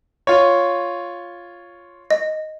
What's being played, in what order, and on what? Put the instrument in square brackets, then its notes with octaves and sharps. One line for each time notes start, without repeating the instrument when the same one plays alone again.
[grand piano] F4 C#5
[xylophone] D#5